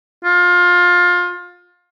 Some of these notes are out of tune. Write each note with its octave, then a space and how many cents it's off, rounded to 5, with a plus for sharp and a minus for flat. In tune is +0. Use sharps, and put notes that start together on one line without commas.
F4 +25